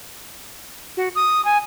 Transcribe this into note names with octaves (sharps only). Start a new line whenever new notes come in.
F#4
D#6
G#5